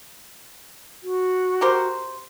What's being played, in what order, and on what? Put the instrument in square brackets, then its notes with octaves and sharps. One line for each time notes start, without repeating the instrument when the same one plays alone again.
[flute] F#4
[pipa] G4 A#4 C5